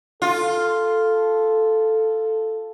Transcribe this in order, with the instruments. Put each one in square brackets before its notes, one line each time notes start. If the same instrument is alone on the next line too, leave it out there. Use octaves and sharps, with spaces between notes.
[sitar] F4 [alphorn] A4